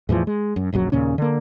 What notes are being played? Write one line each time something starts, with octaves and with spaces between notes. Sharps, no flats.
E2 A2 E3 F3
G#3
F#2
D1 A#1 F#2 F#3
D#2 A#2 C#3 C#4
D3 A#3